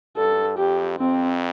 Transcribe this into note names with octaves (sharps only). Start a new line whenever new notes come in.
G2 A4
F2 G4
F2 C4